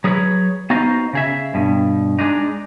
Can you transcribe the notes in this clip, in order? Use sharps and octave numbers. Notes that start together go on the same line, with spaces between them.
F#3 G#4 A4 B4 C#5
B3 D#4 F#4 C5 D#5 F5
C#3 G#4 E5
G2 B2
G#3 D4 D#4